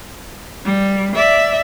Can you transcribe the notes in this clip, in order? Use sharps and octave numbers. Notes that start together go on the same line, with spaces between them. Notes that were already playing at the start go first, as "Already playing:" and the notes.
G3
D5 E5